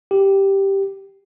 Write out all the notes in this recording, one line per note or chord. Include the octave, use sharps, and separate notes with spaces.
G4